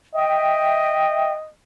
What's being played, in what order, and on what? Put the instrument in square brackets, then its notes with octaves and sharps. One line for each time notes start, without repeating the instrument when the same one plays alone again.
[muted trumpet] D#5 [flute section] E5 G5